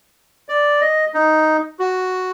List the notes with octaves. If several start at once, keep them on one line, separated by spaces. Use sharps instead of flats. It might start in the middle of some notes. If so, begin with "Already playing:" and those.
D5
D#5
D#4
F#4